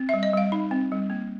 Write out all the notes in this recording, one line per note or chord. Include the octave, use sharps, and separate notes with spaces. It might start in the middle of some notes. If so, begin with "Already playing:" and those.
Already playing: C4
G3 E5
D#5
G3 F5
D#4
C4
G3
A#3